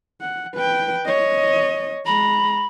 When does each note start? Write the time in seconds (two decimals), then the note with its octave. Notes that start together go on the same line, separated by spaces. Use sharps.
0.21 F#5
0.55 B4 G5
1.05 C#5 D#5
2.06 G#3 A#5 B5